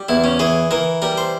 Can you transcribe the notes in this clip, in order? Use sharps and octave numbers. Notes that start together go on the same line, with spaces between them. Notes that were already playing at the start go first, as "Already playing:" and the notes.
Already playing: G3
E2 E4
C#4
E3 G#4
E3 A#4
G3 A#4
C5